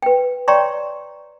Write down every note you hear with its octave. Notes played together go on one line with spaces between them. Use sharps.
B4 G5
C#5 D5 G5 A#5 C6 C#6